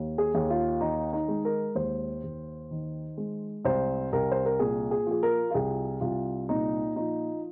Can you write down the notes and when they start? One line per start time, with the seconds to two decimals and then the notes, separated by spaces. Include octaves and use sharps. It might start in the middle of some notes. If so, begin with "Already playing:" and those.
Already playing: D#2
0.18 G#4
0.34 D#2
0.50 F4
0.81 D#3 D#4
1.13 D#4
1.28 G#3
1.45 A#4
1.75 D#2 C5
2.23 D#2
2.71 D#3
3.17 G#3
3.65 C2 C5
4.13 C2 A#4
4.31 C5
4.46 A#4
4.59 A#2 G#4
4.91 G#4
5.06 F3 G#4
5.23 A#4
5.51 F4
5.54 C2 G#4
6.01 C2 F4
6.49 A#2 D#4
6.96 F3 D#4